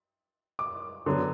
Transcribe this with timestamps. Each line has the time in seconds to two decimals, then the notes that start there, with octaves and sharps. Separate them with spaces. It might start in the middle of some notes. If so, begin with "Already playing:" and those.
0.59 D6
1.06 D3 F#3 B3